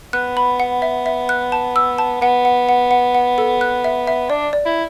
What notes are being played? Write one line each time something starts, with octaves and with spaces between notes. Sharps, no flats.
B3 F#6
B5
F#5
E5
E5
F#6
A5
E6
A5
B3 F#5
F#5
F#5
F#5
F#5
A4
F#6
E5
E5
D4 D5
D5
E4